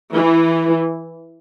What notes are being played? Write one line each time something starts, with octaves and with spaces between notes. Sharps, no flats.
E3